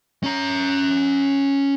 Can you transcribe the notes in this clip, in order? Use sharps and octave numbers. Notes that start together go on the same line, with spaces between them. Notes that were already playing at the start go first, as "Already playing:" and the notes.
C#4 A#5